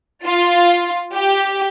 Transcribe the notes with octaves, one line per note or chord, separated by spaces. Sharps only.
F4
G4